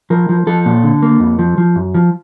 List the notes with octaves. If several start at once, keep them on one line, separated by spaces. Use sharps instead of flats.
F3 A#4
F3
F3 A4
A#2
D3
A#3
F2
F3
F3
F#2
F3